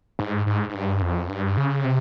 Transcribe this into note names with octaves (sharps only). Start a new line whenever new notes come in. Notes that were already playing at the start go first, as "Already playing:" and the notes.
G#2
G#2
G#2
G2
F2
G2
C#3
C3